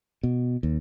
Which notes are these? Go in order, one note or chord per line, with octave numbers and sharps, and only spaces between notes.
B2
D#2